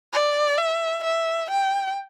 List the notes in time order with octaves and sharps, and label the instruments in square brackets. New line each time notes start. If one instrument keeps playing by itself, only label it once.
[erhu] D5
E5
E5
G5